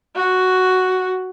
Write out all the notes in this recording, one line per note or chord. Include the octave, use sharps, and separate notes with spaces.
F#4